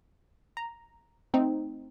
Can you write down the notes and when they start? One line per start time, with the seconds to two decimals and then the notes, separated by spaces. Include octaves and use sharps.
0.57 A#5
1.34 A3 C4 D#4